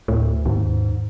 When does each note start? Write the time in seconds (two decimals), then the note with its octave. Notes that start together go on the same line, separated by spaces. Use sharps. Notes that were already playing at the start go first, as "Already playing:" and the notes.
0.08 D2 A2
0.46 D#2 G#2